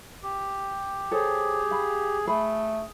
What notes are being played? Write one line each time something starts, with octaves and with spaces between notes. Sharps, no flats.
G4
G#4 A4 C5 C#5
F5 B5
A3 G#4 A5 B5